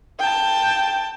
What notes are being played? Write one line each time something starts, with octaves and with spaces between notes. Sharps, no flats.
G5 A5